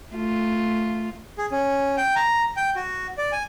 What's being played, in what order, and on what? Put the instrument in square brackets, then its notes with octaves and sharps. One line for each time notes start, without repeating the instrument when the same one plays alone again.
[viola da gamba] A3 F4
[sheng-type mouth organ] G#4
C#4
G5
A#5
G5
F#4
D5
G#5